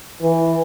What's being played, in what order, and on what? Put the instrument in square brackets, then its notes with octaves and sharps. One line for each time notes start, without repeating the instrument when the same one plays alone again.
[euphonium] E3